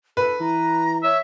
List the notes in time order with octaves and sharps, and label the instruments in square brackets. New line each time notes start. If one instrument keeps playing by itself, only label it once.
[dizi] A4 [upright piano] B4
[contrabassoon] E3 [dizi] A#5
[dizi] C#5 [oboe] E5